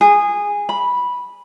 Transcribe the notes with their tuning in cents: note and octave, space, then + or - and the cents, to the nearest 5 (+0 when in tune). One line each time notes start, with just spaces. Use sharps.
G#4 -15
B5 -10